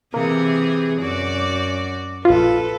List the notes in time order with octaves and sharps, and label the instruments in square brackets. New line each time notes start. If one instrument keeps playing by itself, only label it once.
[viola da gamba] C3 E3 G#4 [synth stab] A#3
[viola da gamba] F#2 F#4 D5
[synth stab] A#1 F4 [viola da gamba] A4 B4